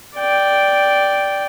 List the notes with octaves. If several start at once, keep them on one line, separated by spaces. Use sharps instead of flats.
D5 G5